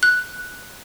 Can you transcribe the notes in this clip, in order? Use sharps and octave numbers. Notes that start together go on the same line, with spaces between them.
F#6